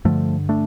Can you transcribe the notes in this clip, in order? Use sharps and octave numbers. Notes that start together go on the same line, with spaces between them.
G2 D3 F3 A3
A3 D4